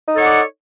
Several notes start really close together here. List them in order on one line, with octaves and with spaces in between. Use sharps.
D#4 A4 C#5 F#5 D5